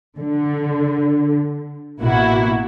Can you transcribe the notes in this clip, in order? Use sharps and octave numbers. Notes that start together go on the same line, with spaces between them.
D3
A1 B2 A#3 E4 F#4